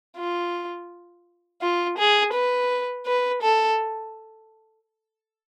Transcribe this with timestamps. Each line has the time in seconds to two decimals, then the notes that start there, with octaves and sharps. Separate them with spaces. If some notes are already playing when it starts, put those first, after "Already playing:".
0.17 F4
1.62 F4
1.98 G#4
2.34 B4
3.06 B4
3.42 A4